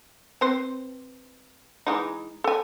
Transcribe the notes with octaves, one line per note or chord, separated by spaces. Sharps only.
C4 B4 C5
E3 G#3 D#4
A4 G#5